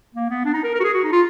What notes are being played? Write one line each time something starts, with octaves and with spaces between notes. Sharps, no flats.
A#3
B3
D4
D#4
A#4
A#4
F#4
G#4
F#4
D#4
F4